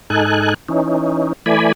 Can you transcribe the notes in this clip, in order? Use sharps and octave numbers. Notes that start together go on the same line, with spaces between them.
G#2 D#4 A4 G#5 F#6
E3 C#4 D#4
E3 A3 D5 G#5 B5